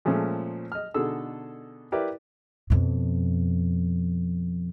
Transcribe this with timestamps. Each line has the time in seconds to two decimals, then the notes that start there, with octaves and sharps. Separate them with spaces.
0.05 A#2 F3 G#3 A3 C#4
0.72 D#5 F6
0.94 B2 D3 D#4 G#4 A4 E6
1.92 E4 G4 A#4 B4 D5
2.70 F2 B2